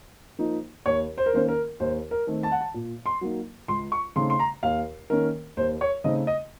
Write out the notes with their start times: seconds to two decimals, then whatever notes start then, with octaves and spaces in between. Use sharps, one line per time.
0.39 F3 A#3 D#4
0.86 D#2 C#5
1.18 C5
1.26 A#4
1.33 D#3 A#3 C#4 C5
1.48 A#4
1.80 D#2 C5
2.11 A#4
2.27 D#3 A3 C4
2.43 A5
2.52 F#5
2.61 A5
2.74 A#2
3.06 C6
3.21 F#3 A#3 D#4
3.68 C#2 C6
3.92 C#6
4.16 C#3 A3 C4 D#4 C6
4.30 C6
4.39 A#5
4.63 D#2 F5
5.10 D#3 A#3 C#4 A#4
5.57 D#2 C5
5.81 C#5
6.04 C#3 A3 C4 D#4 D#5
6.27 D#5